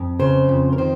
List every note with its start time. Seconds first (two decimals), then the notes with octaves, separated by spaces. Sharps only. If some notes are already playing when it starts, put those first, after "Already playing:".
Already playing: F2
0.20 C#3 C5
0.49 F2
0.73 A#4
0.78 D#3 C5